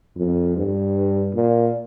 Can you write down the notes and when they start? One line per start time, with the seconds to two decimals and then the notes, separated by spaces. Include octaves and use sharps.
0.17 F2
0.56 G2
1.35 A#2